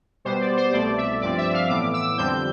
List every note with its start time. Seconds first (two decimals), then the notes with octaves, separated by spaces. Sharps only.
0.25 B2 G3 B3 C5
0.41 D5
0.57 C5
0.73 C2 B2 A3 D5
0.98 E5
1.21 G2 F3 C4 D5
1.38 E5
1.54 F5
1.69 A2 E3 B3 D6
1.94 E6
2.18 F2 D3 G3 C4 G6